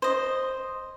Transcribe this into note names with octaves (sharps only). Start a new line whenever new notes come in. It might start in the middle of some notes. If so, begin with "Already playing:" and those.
C5 D#5